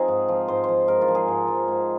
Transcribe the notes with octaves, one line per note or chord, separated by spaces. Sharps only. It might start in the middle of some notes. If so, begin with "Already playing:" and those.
Already playing: F3 C4 D#4 F4 G#4 A#4
G#2
F3
G#2 C5
F3 C5
G#2 A#4
F4
F3
G#4
G#2
F3
G#2